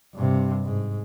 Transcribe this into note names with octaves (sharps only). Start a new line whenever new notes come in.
G2 C3
G#2